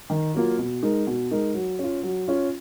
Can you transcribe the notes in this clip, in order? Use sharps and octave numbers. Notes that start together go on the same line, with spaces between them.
D#3
F#3 A#3 F4
B2
G#3 D#4 A#4
B2
G#3 D#4 A#4
F#3
C#4 F4
F#3
C#4 F4